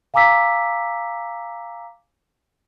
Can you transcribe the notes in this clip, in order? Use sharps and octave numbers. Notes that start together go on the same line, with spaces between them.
F5 G#5 A#5 D6 E6 B6